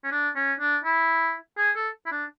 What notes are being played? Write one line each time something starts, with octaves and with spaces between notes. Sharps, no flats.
C#4
D4
C#4
D4
E4
G#4
A4
E4
D4